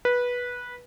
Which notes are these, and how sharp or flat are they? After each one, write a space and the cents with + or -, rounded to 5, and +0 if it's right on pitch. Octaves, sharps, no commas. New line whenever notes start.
B4 -15